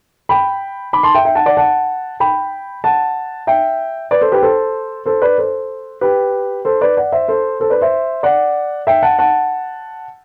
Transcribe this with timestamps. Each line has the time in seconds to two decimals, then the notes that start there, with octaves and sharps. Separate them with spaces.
0.29 G5 B5
0.93 B5 D6
1.03 A5 C6
1.15 E5 G5
1.25 E5 G5
1.35 F#5 A5
1.46 D5 F#5
1.57 F#5 A5
2.20 G5 B5
2.84 F#5 A5
3.47 E5 G5
4.11 B4 D5
4.21 A4 C5
4.32 G4 B4
4.42 A4 C5
5.06 A4 C5
5.22 B4 D5
5.38 A4 C5
6.01 G4 B4
6.65 A4 C5
6.81 B4 D5
6.97 D5 F#5
7.12 C5 E5
7.28 A4 C5
7.60 A4 C5
7.70 B4 D5
7.81 C5 E5
8.23 D5 F#5
8.87 E5 G5
9.02 F#5 A5
9.19 F#5 A5